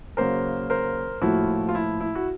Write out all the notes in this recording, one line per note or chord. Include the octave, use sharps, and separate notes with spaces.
C#3 F#3 A#3 A#4 C5
A#4 C5
A2 F3 A#3 E4 F#4
F4
E4
E4
F#4